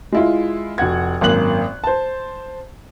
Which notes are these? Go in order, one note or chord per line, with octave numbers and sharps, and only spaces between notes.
G#3 E4 F4
F1 F#4 F#5 G#6
G#1 F#2 A#3 F#6 F#7
C5 A5